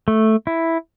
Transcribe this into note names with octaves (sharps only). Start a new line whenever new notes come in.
A3
E4